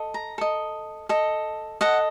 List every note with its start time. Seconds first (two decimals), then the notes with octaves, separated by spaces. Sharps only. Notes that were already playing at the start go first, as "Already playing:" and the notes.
Already playing: A4 D#5
0.14 A#5
0.38 A4 D#5
1.09 A4 D#5
1.81 A4 D#5 F#5